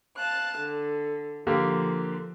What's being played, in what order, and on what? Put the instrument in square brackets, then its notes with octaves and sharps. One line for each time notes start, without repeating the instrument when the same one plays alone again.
[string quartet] F5 A5 F#6
D3
[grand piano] D3 A#3 G4 [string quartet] F3